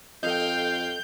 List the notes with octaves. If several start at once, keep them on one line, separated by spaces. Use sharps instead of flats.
F2 A4 D#5 F5 G5 G6